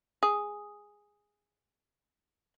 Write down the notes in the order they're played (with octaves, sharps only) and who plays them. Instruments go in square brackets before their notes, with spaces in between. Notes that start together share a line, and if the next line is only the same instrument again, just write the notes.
[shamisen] G#4 [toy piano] D#6